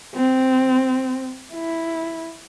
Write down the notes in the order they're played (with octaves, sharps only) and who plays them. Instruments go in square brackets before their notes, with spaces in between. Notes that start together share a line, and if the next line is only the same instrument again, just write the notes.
[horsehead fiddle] C4
E4